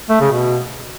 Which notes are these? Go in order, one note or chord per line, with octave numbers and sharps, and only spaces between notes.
A3
C#3
B2